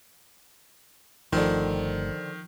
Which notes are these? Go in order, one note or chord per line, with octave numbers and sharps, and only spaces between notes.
G1 D3 D#3 F3 A3 C4